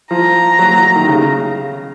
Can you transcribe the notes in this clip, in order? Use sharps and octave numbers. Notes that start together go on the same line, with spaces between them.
F3 A#5
F#3
F#3
D#3
C#3